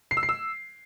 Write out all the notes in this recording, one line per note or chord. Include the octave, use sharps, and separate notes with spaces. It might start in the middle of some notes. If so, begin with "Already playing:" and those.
C7
E6
C7
E6